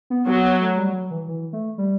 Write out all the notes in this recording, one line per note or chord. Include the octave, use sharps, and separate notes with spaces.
B3
F#3 B3
B3
A3
G3
F#3
E3
E3
A3
G3